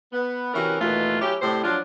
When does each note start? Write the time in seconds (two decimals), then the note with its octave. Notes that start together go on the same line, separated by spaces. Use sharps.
0.13 B3
0.54 C3 E3 C#4 F#4 A#4
0.81 D#2 B2 E3 A3 F4
1.21 F#3 C#4 E4 G4
1.42 A2 C3 G3 C5
1.64 F3 F#3 D4 F4